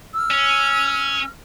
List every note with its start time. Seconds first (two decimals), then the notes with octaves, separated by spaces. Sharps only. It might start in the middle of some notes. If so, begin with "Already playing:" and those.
0.14 E6 F6
0.31 C#4